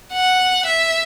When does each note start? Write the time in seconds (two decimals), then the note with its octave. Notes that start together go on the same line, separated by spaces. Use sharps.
0.12 F#5
0.65 E5